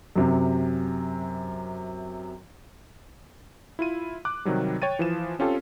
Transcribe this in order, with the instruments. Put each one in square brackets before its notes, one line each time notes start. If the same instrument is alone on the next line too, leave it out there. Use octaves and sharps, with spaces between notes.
[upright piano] F#2 C3
[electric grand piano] E4 F4 D#7
D6 F#6
C3 D#3 F#3 G3
C#5 G5 A6 D#7
E3 F3 E7
C4 C#4 F4 G4 A4